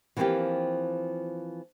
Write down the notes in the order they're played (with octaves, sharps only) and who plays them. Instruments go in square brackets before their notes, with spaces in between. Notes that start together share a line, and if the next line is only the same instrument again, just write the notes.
[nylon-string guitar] E3 F3 A#3 C4 F4 G4